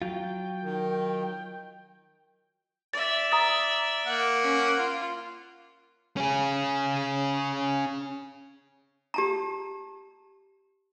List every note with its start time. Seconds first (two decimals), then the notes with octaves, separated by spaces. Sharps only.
0.02 F#3 F4 G5
0.63 D#3
2.93 D5 E5 A6
3.32 A#5 D#6 A6
4.06 A#3 F#5
4.43 C#4
4.77 F4
6.17 C#4 G#4
9.14 G4 A5 A#5